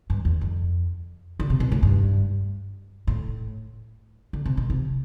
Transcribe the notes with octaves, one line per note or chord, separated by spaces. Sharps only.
G2
E2
F2
D3
C3
B2
A2
G2
A2
D3
C3
B2
C3